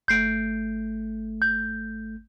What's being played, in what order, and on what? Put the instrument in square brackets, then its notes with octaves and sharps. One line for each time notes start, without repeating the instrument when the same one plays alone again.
[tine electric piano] G#1 A3 [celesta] G6 C7 D7
[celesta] G6